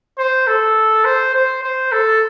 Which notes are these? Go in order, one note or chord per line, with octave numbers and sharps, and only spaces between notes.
C5
A4
C5
C5
C5
A4